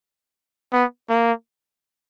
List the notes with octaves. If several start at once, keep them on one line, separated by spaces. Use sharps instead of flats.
B3
A#3